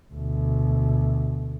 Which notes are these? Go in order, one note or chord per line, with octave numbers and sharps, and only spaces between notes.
D2 B2